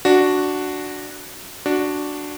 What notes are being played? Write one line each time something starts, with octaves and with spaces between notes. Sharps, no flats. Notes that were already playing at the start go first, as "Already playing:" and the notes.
D4 F#4
D4 F#4